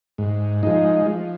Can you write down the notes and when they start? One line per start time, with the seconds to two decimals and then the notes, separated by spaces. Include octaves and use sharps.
0.18 G#2
0.63 F3 G#3 D#4
1.06 F3